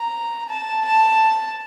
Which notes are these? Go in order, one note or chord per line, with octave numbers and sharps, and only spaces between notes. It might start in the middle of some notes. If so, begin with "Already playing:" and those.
Already playing: A#5
A5
A5